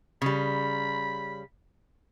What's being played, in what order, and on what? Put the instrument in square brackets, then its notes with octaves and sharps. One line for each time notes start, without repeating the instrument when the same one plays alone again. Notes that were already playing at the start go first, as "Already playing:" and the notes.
[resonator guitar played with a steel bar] C#3 G3 [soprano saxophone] B5